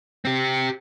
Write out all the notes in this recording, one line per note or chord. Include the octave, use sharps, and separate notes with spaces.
C4 G4